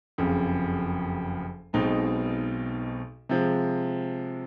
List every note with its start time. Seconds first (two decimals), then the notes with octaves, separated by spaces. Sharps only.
0.18 F#1 F2 C#3
1.73 B1 B2 G#3 C4 D#4
3.29 C3 F3 G#3